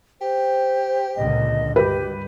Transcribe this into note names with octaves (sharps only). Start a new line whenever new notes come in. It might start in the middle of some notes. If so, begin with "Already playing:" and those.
G4 C5
C#2 A#2 D3 D#5
G2 G4 B4